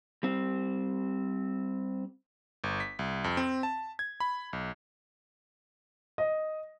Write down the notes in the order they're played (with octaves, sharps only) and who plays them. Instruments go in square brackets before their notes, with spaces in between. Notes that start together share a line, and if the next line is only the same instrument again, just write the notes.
[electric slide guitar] G3 C4
[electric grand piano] G1
B6
C2
F2
C4
A5
G#6
B5
B1
[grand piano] D#5